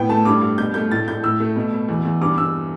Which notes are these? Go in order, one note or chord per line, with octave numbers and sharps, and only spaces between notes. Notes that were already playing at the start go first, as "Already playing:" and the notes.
Already playing: A2 B3 G5
A3 A5
G2 D6
G2
B2 G6
A3 G6
A2 A6
A2 G6
A2 E6
A3
B2
B2
E2
E2
G2 D6
G2 E6